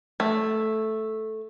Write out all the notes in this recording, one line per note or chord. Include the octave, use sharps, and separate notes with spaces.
A3